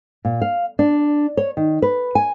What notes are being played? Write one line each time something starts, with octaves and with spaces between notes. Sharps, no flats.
A#2
F5
D4
C#5
D#3
B4
G#5